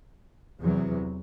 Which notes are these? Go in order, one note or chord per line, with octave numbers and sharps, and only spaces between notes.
E2 C3 F#3